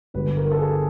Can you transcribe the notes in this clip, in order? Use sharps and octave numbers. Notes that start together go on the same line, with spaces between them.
G1 G2 D3 G3 B4
A#4
A4
G#4